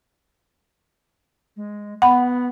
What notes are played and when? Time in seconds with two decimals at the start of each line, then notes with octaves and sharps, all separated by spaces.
1.56 G#3
2.02 B3 F#5 B5